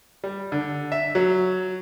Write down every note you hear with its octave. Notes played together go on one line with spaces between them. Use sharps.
G3
D3
E5
F#3